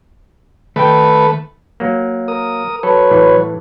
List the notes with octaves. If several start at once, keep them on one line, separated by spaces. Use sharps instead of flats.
D#3 A3 B4 G5
F#3 A#3
A#4 D#6
F#3 A4 B4 C#5
A2 E3